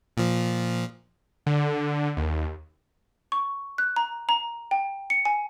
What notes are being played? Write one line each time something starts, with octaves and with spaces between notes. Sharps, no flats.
A#2 F3
D3
D#2
C#6
F#6
A#5
A#5
G5
C#7
G#5